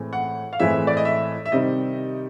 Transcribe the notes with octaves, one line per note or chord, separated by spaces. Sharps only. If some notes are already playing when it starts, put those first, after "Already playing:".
Already playing: A2 E3 G#3 C4
F#5
F5
A2 E3 G#3 C4 E5
D5
D#5
E5
E5
C3 D#3 G3 C4 D#5